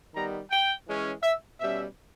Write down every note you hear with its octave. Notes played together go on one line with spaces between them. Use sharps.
D#3 G3 B3 A#5
G5
E3 G#3 C#4
E5
B2 G3 C#4 E5